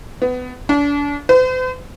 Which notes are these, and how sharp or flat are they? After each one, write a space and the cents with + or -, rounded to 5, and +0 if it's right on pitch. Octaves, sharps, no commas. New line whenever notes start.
B3 +25
D4 -35
C5 -45